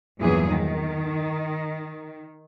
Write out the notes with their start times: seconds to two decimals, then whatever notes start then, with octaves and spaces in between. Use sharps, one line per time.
0.19 E2 G2 A#2 E3 F#3 G#4
0.49 D#3